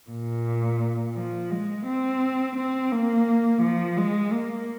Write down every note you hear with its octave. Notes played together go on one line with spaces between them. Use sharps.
A#2
F3
G#3
C4
C4
A#3
F3
G#3
A#3